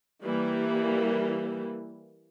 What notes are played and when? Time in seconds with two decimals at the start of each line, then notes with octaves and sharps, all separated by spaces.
0.22 E3 G3 A#3